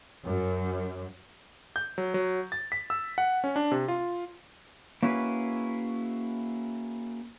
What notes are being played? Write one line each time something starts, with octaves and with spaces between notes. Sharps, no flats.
F#2
G6
F#3
F#3
A6
B6
E6
F#5
C#4
D4
C3
F4
A#3 C#4 E4 F#4 G#4 B4